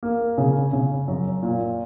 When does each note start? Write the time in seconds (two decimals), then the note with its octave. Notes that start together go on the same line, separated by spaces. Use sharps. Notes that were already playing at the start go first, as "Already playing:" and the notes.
0.03 A#3
0.38 C#3
0.73 C#3
1.08 F#2
1.43 A#2